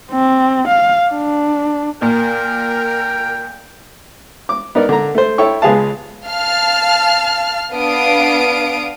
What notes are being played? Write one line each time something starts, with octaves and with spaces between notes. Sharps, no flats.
C4
F5
D4
A#2 A#4 G5
D6
B3 D#4 A#4 D5
D3 A#5
A3 C5
E4 A4 C#5 G5 C#6
C#2 G#3 G#4 B4 F5 A5
F5 A5 F6
B3 D4 F5 D#6 D7